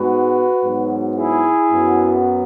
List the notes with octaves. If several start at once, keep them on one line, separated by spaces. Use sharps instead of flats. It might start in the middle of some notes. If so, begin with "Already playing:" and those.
Already playing: G#2 G#3 B3 F#4 B4
G#2 F#3 B3
E4 G#4
F#2 F#3 B3